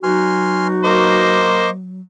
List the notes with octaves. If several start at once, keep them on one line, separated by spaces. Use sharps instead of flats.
B2 F#3 D#4 F#4 G#5 C6 F6
A#3 C5 D#5 C#6 D6